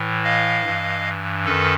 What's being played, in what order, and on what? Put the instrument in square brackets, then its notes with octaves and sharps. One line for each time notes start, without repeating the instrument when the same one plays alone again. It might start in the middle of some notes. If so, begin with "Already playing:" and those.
Already playing: [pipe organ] A2 E3
D#5 F5
G2 E3
F#2 D#3 A4 B4